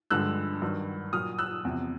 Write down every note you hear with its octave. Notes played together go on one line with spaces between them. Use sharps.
G2 D3 F3 G#3 E6 F#6
G2 D#3 F#3
A#2 F#3 D#6 F6
E6 F#6
E2 C3 F3